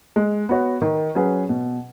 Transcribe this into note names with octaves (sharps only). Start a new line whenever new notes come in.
G#3
B3 F#4 C#5
D#3
F#3 C#4 G#4 B4
B2